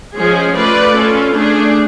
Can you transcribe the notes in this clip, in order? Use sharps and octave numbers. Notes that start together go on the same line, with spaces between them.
F3 G#3 C#4 G#4
A3 F4 B4 D5
C#4 F4 A4
A3 D4 G#4